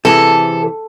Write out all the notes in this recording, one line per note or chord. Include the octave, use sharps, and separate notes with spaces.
C3 E3 G#4 A4